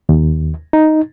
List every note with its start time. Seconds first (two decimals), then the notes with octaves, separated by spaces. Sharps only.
0.09 D#2
0.73 D#4